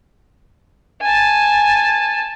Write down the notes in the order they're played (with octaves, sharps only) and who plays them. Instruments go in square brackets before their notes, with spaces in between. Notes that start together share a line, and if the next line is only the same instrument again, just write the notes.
[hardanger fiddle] G#5 A5